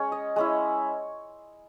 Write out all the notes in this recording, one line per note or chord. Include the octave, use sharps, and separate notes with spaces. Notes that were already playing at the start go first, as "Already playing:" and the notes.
Already playing: G#3 C#4 C#5
D#5
G#3 C#4 E4